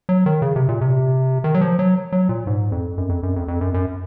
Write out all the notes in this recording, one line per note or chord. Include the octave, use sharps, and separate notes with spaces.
F#3
D#3
C#3
C3
A#2
C3
D#3
F#3
F3
F#3
F#3
A#2
G#2
F2
F#2
F2
F#2
F2
F2
F#2
F#2